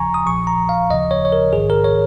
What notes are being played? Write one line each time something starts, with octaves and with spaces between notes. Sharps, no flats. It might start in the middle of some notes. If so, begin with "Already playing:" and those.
Already playing: D#2 C#3 F3 G#5 A#5 C#6
D#6
A#1 A#2 F3 C#6
A#5
F5
D#2 C#3 F3 D#5
C#5
C#5
A#4
A#1 G#2 D#3 G#4
A#4
C#5